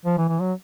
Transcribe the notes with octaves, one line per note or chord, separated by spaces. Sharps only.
F3
E3
E3
F#3